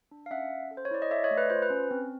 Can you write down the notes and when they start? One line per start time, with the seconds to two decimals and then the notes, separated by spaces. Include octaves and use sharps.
0.11 D4
0.26 F5
0.31 C#4 E5 F#5
0.51 C#4
0.71 A4
0.77 C5
0.85 C#5
0.91 E4 D5
1.02 D#5
1.11 A4 D5 E5
1.24 C#5 D#5
1.31 A3
1.38 B4
1.50 F4 C5
1.62 B4
1.70 C#4
1.91 C4